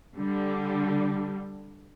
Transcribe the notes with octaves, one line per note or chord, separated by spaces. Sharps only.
D3 G3